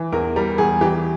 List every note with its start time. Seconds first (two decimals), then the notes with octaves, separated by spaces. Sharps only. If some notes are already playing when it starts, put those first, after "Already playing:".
Already playing: E3
0.12 E2 A#4
0.36 G3 A#4
0.58 E2 G#4
0.81 E3 G4